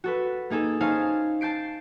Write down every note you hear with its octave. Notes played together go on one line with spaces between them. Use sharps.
F#4 A4 B4
A#3 D#4 G#4 A4
C#4 D#4 C5 F5 G#5 A5
A5 G6 C7 D7